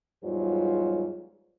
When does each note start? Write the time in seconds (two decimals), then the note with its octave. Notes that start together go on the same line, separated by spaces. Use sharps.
0.24 E2 G#2 F#3 G3 F4